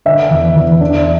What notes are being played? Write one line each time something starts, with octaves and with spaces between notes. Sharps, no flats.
D3 E5
E2
E2
D4